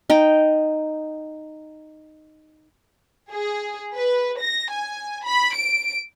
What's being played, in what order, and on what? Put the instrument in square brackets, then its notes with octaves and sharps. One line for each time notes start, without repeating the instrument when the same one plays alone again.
[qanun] D#4 G5
[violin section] G#4
B4
A#6
G#5
B5
D7